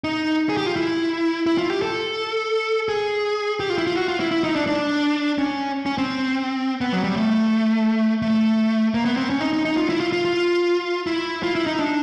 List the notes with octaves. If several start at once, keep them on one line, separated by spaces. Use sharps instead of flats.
D#4
G#4
G4
F4
E4
E4
F4
G4
A4
G#4
G4
F4
E4
F4
F#4
F4
E4
E4
D#4
D4
D4
C#4
C#4
C4
B3
F#3
G3
A3
A3
A#3
B3
C4
C#4
D#4
D#4
D#4
F4
E4
F4
F4
F4
E4
F4
E4
D#4
D4